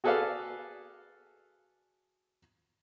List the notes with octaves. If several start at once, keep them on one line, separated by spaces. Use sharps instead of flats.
F#4 G#4 A4 B4 D5 F5